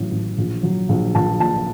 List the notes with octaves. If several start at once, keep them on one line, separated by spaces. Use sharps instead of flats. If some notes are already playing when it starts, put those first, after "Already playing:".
Already playing: A1 F#3
A1
A#1
F#3
A#1
A#1 A5
A#2 A5